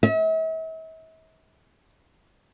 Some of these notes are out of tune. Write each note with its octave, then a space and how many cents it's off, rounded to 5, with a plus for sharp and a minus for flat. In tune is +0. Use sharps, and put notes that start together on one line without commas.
E5 -45